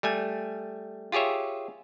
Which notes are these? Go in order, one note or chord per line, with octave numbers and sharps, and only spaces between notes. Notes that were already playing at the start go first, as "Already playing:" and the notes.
G3 A3 G#5
F4 G4 G#4 C#5 E5